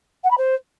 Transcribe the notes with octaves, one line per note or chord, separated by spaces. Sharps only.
F#5
B5
C5